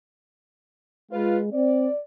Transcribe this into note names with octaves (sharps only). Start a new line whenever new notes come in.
G#3 F4 B4
C4 D5